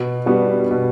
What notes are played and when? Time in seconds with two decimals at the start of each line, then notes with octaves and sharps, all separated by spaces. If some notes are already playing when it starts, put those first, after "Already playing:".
Already playing: B2
0.26 G3 B3 D4 F#4
0.71 B2